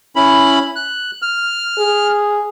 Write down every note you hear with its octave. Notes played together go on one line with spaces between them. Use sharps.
C#4 E4 B5
F#6
F6
G#4